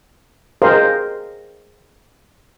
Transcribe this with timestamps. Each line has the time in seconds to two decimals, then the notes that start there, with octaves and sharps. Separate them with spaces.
0.62 G#4 A#4 C5 D#5 F5